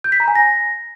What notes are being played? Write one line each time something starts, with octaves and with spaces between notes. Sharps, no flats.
G6
B6
A#5
G#5
A#6